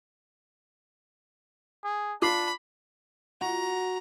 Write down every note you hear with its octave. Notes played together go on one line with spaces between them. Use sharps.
G#4
D4 F4 A5 B5 D6 C7
F#4 A#5